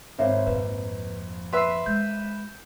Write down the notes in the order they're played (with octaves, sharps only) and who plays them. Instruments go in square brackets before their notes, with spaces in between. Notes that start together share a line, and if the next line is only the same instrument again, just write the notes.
[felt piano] G#1 C5 [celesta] C#5 E5 F5
[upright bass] F2 A#2 [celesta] B4
[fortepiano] B4 E5 [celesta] C6 E6 C7
[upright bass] G#3 [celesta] G6